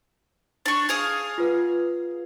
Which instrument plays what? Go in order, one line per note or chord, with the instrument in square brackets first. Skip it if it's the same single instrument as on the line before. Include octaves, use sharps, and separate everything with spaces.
[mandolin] D4 C#6
G#4 F5 D#6
[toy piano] F4 B4 F#5